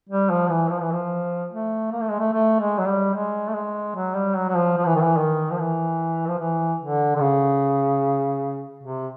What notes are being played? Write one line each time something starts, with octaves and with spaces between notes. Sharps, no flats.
G3
F3
E3
F3
E3
F3
A3
A#3
A3
G#3
A3
A3
G#3
F#3
G3
G#3
A3
G#3
F#3
G3
F#3
F#3
F3
F3
E3
D#3
E3
D#3
F3
E3
F3
E3
D3
D3
C#3
C3